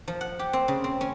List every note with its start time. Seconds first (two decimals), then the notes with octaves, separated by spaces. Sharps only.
0.08 F3
0.21 F#5
0.39 G4
0.53 C4
0.68 C#3
0.84 C4
1.01 C#4